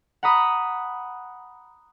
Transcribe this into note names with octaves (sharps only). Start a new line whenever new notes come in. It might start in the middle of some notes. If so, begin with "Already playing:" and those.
F#5 A#5 B5 D#6